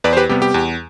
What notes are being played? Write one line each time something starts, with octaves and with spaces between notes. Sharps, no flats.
E2 B4 D5
C5
G4 B4
C3 G3 B3 G4
G4
E2